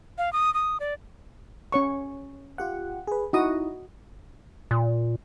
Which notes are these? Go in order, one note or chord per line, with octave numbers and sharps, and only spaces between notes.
F5
D#6
D#6
D5
C#4 C#5 C#6
F4 G4 F#5
G#4 B4
D#4 E4 F#4 D#5 D#6
A#2